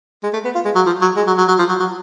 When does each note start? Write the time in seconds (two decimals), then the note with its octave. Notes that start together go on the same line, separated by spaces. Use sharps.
0.23 G#3
0.34 A3
0.45 B3
0.55 F4
0.65 G#3
0.75 F#3
0.86 F3
1.01 F#3
1.17 G#3
1.27 F#3
1.38 F#3
1.48 F#3
1.59 F3
1.69 F#3
1.80 F#3